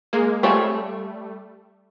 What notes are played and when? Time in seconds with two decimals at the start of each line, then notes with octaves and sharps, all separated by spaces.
0.13 G#3 A#3
0.43 G3 A3 C4 F4 G#4 C#5